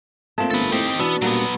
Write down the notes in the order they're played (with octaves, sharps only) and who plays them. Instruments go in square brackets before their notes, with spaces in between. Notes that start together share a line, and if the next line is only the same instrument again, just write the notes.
[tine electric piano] A3 A#3 F4 [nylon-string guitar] C4 A5
[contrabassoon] G1 [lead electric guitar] A4 B4
[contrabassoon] A2 [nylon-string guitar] C4 [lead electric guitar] D#4 G4
[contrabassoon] B2 [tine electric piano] E3 E6 [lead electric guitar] B3 [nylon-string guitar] C#4 D4
[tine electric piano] A#2 G3 A#3 [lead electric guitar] F#3 B3